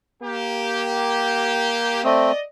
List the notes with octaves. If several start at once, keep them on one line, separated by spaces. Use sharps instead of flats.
A#3 G4
A3 C4 D5 D#5